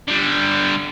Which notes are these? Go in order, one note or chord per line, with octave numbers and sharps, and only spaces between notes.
D3 G3